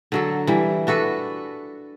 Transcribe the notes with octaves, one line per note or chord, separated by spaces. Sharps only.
D3 F#3 A4
E3 G3
D4 F#4 A4 B4